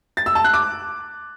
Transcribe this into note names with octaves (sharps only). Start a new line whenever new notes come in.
A6
E6
A5
F#6
D6